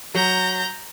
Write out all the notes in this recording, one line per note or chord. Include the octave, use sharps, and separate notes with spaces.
F#3 A#5 G6